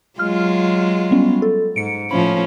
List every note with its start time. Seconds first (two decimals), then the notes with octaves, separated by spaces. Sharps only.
0.19 F#3 G#3 F4 F6
1.11 G3 B3 C#4
1.42 A4
1.76 G#2 C#7 D7
2.11 A2 F3 C#4 B5